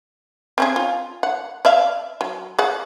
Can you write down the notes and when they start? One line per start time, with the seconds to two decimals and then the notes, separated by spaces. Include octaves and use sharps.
0.58 C4 C#4 G#4
0.76 F4
1.23 F#5
1.65 D5 E5 F5
2.21 F#3
2.59 G#4 D5 F#5